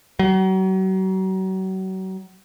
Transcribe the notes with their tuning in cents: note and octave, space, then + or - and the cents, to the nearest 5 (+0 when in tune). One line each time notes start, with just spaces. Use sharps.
F#3 +35